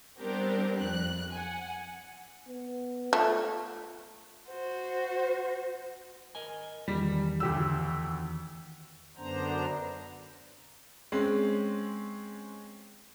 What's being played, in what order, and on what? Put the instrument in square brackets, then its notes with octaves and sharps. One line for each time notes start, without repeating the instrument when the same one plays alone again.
[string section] G3 B3 C4 D4 G4 A#4
F2 F#6
F#5 G#5
[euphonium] B3
[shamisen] A3 [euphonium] F4
[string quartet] F#4 C5
[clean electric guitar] A#4 D#5 G#5
[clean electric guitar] E2 D#3 [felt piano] G3
[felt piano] D2 G4 E6
[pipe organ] F#2 D3 B3 D4 C5 A#5
[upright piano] G#3 C4 C#4